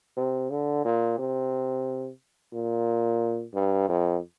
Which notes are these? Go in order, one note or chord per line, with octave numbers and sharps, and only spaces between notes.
C3
D3
A#2
C3
A#2
G2
F2